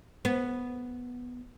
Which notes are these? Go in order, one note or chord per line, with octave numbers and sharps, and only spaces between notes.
B3